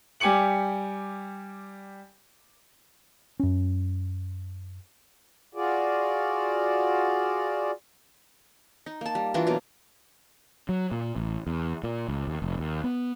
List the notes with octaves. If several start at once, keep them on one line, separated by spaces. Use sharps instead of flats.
G3 G4 G#5 D6 C#7 F#7
F#2 C#4
F4 F#4 G#4 D5
D#4
A#3 A5
G3
E3 D4 F4 F#4
B2 F#3 A#3 A#5
F#3
A#2
A1
E2
A#2
C#2
D#2
F1
D#2
B3